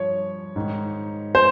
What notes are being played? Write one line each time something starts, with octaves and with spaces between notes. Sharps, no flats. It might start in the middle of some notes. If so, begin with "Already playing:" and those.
Already playing: G2 F3 C#5
G#2 D#3
C5